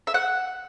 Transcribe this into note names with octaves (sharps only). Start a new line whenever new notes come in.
E5
F#5